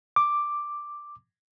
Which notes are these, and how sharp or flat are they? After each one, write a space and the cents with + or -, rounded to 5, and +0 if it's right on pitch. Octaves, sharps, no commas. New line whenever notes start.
D6 +5